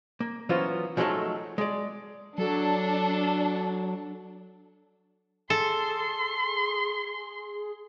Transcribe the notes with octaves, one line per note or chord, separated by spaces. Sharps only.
A#3
E3 F#3 B3 C#4 F4 C5
F3 F#3 G#3 A3 D#4 A4
G#3 D5
F#3 D4 A4
G#4 A4 C6